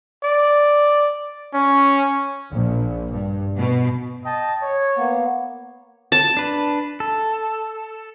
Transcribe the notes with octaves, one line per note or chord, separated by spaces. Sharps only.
D5
C#4
A#1
G2
B2
D#5 G5 A5
C#5
A#3 B3
A5
D4 B4
A4